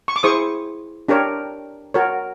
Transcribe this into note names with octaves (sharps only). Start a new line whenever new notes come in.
C#6
D6
E4 G#4 C5 C#6 D#6
D4 G4 A#4 C#5
F#4 A#4 C#5